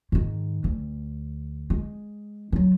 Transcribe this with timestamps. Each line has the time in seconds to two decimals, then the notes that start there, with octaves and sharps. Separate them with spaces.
0.12 G#2 D#3
0.64 D2
1.70 G#3
2.52 F#3 E4